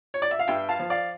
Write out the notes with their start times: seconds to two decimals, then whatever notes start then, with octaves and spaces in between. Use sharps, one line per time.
0.14 C#5
0.22 D5
0.31 E5
0.39 F5
0.48 G2 E5 G5
0.69 F5 A5
0.79 F3
0.90 D5 F5